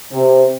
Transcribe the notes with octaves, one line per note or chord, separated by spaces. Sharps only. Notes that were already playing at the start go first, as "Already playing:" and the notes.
C3